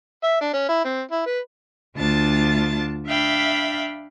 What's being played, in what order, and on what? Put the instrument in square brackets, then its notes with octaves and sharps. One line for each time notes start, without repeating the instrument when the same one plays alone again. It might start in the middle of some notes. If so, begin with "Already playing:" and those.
[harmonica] E5
D4
C#4
E4
C4
E4
B4
[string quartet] D2 D4 F4 A5 A6
D4 E5 F5 G5 B5